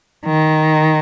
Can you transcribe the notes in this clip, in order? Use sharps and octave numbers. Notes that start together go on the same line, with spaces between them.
D#3